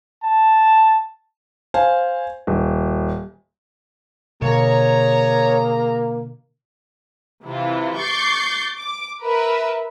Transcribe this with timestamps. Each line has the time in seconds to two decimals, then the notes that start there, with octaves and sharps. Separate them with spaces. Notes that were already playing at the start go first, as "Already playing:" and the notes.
0.23 A5
1.74 C5 F5 G#5
2.47 D#1
4.42 B2 D3 A#3 G#4 C#5 A#5
7.46 C3 E3 E4 F4
7.98 C#6 D6 G6 A6 C7
8.78 D6
9.23 A#4 B4 E5